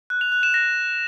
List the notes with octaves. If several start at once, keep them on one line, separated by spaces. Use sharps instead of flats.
F#6
F7
F#6
E7
A#6